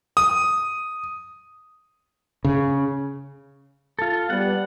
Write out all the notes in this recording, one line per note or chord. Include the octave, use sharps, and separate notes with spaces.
D#6
C#3
F4 A4
G3 B3 F#5